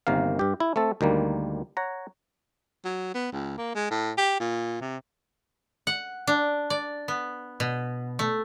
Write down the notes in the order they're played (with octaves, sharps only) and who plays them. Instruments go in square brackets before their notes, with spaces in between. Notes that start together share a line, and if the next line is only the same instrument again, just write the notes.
[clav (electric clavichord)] G1 C3 D#3 A#3 F5
G2 G4
E4
A3 C4 A4
D2 D#3 G3 A#3
C#5 F#5 A#5
[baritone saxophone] F#3
B3
C#2
A#3
G#3
A2
G4
A#2
C3
[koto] F#5
D4
D5
B3
B2
A3